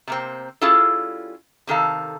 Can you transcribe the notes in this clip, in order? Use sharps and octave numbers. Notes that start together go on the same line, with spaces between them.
C3 A#3 C4
G3 C#4 E4 F4 G#4 A4
C3 D#3 A4 F5